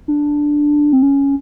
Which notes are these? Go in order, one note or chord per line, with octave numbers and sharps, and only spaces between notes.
D4
C4
C#4